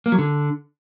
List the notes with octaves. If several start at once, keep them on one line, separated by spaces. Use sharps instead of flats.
A#3
F#3
D3